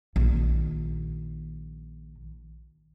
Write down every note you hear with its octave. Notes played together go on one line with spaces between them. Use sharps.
A#1 D#3